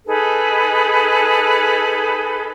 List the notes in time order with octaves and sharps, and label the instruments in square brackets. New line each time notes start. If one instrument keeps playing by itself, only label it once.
[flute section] D#4 G#4 A4 B4